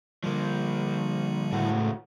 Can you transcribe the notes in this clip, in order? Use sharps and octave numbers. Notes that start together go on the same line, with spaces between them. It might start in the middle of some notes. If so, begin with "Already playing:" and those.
D3 F3 G3 A#3
C#2 A2 F#4